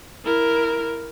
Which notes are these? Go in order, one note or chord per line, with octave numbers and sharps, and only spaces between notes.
E4 A#4